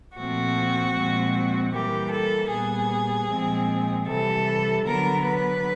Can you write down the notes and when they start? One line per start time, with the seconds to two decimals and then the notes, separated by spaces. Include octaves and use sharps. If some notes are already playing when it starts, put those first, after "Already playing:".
0.17 A#2 F3 A3 C4 F#4
0.95 A#2 F3 G#3 C4
1.73 E3 G3 A#3 G4
2.12 A4
2.51 A#2 G3 B3 G#4
3.30 A#2 F3 G#3 C4
4.07 C3 E3 G3 A4
4.85 D3 F#3 B3 A#4
5.25 B4